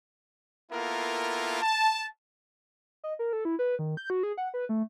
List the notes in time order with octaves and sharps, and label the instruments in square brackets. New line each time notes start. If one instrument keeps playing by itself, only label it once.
[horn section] A#3 B3 E4 F4 A4 A#4
A5
[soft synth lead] D#5
A#4
A4
E4
B4
D#3
G6
F#4
G#4
F#5
B4
A3